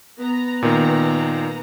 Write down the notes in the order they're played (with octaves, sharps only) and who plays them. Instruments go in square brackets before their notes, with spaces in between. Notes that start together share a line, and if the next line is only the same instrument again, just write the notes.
[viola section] B3 A#5
[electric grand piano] A#2 D#3